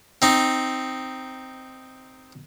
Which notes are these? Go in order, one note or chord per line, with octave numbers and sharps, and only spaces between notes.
C4 D#4